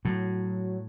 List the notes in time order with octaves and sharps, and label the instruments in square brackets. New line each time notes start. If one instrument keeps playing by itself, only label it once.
[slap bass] A2 [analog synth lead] F#3